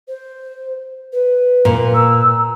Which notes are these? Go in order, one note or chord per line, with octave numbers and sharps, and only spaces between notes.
C5
B4
A#2
E6